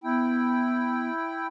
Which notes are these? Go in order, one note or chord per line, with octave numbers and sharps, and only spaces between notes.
B3 E4 G5